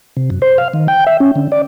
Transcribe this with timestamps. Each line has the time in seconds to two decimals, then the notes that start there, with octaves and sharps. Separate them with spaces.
0.17 C3
0.30 F#2
0.42 C5
0.58 F5
0.73 D#3
0.88 G5
1.07 E5
1.20 C#4
1.35 D3
1.52 D5